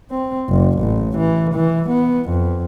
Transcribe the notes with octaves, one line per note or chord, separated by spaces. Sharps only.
C4
F#1
A1
E3
E3
B3
F2